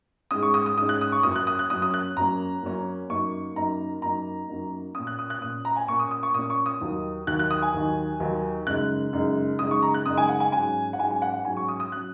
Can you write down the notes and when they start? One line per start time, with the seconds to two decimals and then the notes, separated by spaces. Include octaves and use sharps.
0.31 G#2 G#3 C#4 D#6
0.43 C#6
0.54 D#6
0.66 D#6
0.77 G#2 G#3 C#4 D#6
0.89 F#6
1.01 D#6
1.12 C#6
1.23 F#2 F#3 A#3 C#4 D#6
1.36 F#6
1.47 D#6
1.59 F#6
1.70 F#2 F#3 A#3 C#4 D#6
1.82 D#6
1.94 F#6
2.17 F#2 F#3 A#3 C#4 A#5
2.63 F#2 F#3 A#3 C#4
3.10 F#2 F#3 A#3 D#4 C#6
3.56 F#2 F#3 A#3 D#4 A#5
4.02 F#2 F#3 A#3 D#4 A#5
4.49 F#2 F#3 A#3 D#4
4.95 A#2 A#3 C#4 D#6
5.07 F#6
5.19 D#6
5.30 F#6
5.42 A#2 A#3 C#4 D#6
5.65 A#5
5.76 G#5
5.88 A#2 A#3 C#4 C#6
5.99 D#6
6.11 D#6
6.23 C#6
6.34 A#2 A#3 C#4 D#6
6.50 C#6
6.66 D#6
6.81 D#2 D#3 F#3
7.27 D#2 D#3 F#3 F#6
7.39 F#6
7.51 D#6
7.62 G#5
7.74 D#2 D#3 F#3
8.20 D#2 D#3 F#3
8.67 F#2 C#3 G#3 D#4 F#6
9.13 F#2 C#3 G#3 D#4
9.59 F#2 C#3 G#3 D#4 D#6
9.71 C#6
9.82 A#5
9.94 F#6
10.06 F#2 C#3 G#3 D#4 D#6
10.17 G#5
10.29 F#5
10.40 G#5
10.52 G#2 F#3 C#4 G#5
10.93 F#5
10.99 G#2 F#3 C#4 G#5
11.11 G#5
11.22 F#5
11.34 F#5
11.45 G#2 F#3 C#4 G#5
11.57 C#6
11.68 D#6
11.80 D#6
11.92 F#3 C#4 F#6